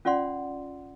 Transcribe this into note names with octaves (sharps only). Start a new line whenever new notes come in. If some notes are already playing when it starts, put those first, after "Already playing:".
C#4 F4 D5 F#5 C6